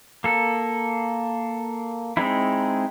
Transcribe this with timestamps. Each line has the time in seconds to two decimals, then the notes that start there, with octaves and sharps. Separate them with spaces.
0.24 A#3 A4
2.17 G#3 C4 D#4 E4